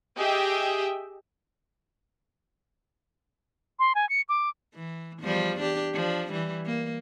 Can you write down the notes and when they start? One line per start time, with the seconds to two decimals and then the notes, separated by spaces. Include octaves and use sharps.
0.18 G4 G#4 D#5 E5 G5
3.79 C6
3.95 G#5
4.09 C#7
4.29 D6
4.74 E3
5.20 E2 F3 G3
5.60 D4 G4
5.93 F3 D4
6.31 E3 G3
6.66 A#3